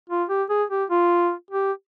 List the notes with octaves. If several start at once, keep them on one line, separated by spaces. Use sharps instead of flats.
F4
G4
G#4
G4
F4
G4